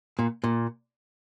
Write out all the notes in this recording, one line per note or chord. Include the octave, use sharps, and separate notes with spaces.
A#2
A#2